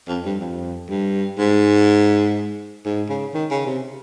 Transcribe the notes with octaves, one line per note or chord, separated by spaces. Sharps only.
F2
G2
F2
G2
G#2
G#2
C#3
D#3
C#3
C3